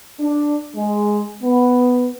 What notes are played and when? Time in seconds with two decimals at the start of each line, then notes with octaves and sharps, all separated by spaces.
0.20 D4
0.75 G#3
1.43 B3